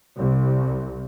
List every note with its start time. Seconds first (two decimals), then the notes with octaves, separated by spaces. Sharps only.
0.19 C2